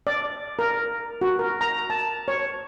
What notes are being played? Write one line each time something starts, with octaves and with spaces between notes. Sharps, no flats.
D5
A#4
F#4
A#4
A#5
A5
C#5